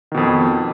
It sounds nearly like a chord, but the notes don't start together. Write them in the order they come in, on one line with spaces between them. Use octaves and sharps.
D#3 B2 F2